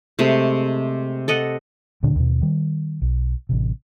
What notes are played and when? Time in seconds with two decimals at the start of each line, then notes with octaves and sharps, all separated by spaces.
0.19 C3 G#3 A3
1.28 A4 D#5 F#5
2.03 D2 A#2 D3 D4
2.16 D#2 B2
2.42 D#3 G3
3.02 B1
3.49 A1 C3